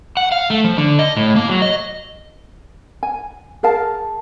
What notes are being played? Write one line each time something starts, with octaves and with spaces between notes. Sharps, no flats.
F#5
F5
A3
F3
D3
D#5
A2
A#3
F#3
D#5
G#5
G#4 A#4 F5 A5